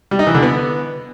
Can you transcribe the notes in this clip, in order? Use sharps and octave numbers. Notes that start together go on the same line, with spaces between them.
G3
D#4
E3
D3
B3